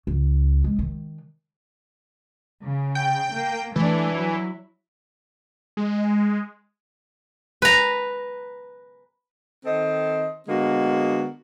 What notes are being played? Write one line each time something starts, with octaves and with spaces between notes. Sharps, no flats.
C#2
G#3
D#3
C#3
G5
A#3
E3 A3 D4
F#3 E4
G#3
B4 A#5
D#3 C4 A4 C5 D#5
D3 G#3 A#3 B3 F#4